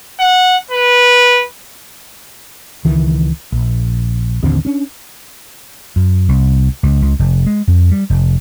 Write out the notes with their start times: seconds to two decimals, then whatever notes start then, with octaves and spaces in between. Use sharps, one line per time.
0.20 F#5
0.71 B4
2.85 C#2 D#3 E3
3.52 A#1
4.43 A1 D#2 D3 C4
4.65 C#4 D4
5.96 F#2
6.29 C2
6.83 C#2
7.02 C#2
7.19 F1
7.46 G#3
7.68 F2
7.91 G3
8.10 F1